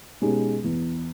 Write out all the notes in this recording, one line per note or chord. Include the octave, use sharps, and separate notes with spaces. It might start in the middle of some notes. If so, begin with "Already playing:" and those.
B2 G#3 B3 C#4 D#4 G4
E2